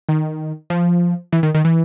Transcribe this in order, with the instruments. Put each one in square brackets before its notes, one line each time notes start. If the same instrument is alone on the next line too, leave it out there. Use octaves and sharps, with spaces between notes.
[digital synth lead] D#3
F3
E3
D#3
D#3
E3